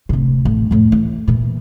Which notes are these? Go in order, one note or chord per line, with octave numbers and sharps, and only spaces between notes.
D1 C3
A1
F2 A2
E3
A#2 E3